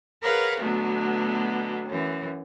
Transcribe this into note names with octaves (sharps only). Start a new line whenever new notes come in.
G#4 A#4 B4 C#5 F5 F#5
B2 D3 F#3 A3 B3
F#2 E3